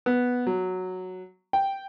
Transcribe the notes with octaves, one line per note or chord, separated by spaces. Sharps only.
B3
F#3
G5